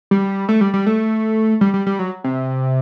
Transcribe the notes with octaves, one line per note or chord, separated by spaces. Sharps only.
G3
A3
G3
G3
A3
G3
G3
G3
F#3
C3